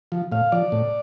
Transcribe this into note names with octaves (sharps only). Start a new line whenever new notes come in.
F3
A2 F5
F3 D5
A2